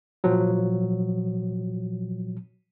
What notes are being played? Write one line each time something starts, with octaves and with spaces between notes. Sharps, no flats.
A#2 F3 F#3